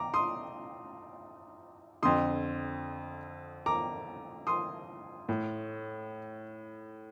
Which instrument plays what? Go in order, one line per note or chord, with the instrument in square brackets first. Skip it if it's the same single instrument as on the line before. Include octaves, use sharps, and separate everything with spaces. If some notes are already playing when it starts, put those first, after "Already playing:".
Already playing: [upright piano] A#5 D6
C6 D#6
F2 D3 C6 D#6
A#5 D6
C6 D#6
A2